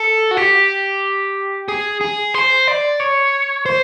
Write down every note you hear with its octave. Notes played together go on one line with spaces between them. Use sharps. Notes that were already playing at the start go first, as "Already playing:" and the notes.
Already playing: A4
F#4
G4
G#4
G#4
C5
D5
C#5
C5